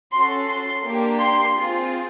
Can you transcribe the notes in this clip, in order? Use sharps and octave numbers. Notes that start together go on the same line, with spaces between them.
C#4 F#4 A4 C6
C6
A#3 D4 G4
C6
C4 F4 G#4